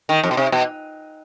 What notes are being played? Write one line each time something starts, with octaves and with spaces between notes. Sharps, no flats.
D#3
F2
B2
C3
B2